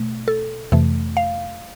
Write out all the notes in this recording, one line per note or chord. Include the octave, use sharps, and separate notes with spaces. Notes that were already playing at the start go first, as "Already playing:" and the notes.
Already playing: B2 A3
A4
F2 C3 E3 A3
F5